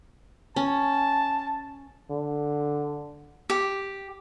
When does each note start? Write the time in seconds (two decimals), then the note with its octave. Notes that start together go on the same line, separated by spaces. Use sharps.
0.56 C#4 A5
2.10 D3
3.50 G4